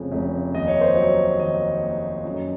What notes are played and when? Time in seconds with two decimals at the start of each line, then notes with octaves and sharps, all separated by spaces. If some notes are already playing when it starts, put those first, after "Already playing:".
Already playing: F1 F2 C#3
0.11 F1
0.54 D#2 D#5
0.68 C#5
0.81 C5
0.95 F#3 C#5
1.39 D#3 D#5
1.81 A#3
2.25 F#2